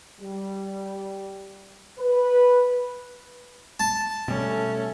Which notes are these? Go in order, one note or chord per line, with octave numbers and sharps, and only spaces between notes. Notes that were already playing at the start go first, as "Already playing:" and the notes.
G3
B4
A5
B2 G3 A3 C#4